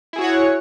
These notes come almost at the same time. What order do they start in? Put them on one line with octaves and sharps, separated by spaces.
E4 G#4 F#4 C#5 F#5